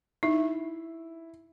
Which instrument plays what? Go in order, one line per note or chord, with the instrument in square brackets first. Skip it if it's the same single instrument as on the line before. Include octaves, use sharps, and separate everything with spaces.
[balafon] D#4 [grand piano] E4